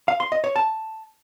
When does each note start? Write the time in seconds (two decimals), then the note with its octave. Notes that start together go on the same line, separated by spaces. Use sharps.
0.08 F5
0.20 C6
0.32 D#5
0.44 C#5
0.56 A5